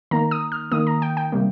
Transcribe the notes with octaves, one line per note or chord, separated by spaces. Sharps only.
D#3 A#3 A#5
D#6
F6
D#3 A#3 D#6
A#5
G5
G5
C3 G3 A#3